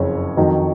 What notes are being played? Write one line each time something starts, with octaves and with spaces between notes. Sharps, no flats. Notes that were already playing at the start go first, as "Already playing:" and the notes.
Already playing: F#1 F2 C#3 C#5
F2 D#3 F#3